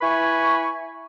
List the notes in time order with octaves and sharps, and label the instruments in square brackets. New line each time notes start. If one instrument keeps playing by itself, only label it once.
[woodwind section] E4 B4 G#5 B5 C#6